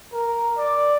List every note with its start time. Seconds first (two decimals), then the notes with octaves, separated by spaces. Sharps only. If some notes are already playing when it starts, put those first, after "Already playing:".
0.13 A#4
0.58 D5